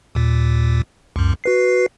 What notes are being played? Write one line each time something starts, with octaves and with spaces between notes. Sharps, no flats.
D#2 A#2
C#2 F#2
F#4 B4 C7